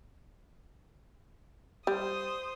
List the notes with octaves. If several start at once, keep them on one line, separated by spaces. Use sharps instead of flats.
G3 C5 D#6